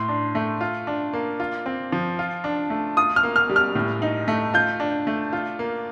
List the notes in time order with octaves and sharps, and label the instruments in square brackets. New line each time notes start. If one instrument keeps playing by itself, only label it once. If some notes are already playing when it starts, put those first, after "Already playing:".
Already playing: [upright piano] A2 [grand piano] C6
[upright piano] D4
A3
F4
D4
A#3
F4
C4
F3
F4
D4
A3
[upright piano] F4 [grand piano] D#6
[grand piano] F6
[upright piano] A#3
[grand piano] F6
[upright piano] G3
[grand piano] F6
[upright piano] A2
D#4
A3
[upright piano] F4 [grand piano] G6
[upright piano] D4
A3
F4
A#3